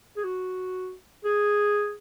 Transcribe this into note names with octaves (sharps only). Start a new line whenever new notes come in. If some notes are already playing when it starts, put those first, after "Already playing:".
G#4
F#4
G#4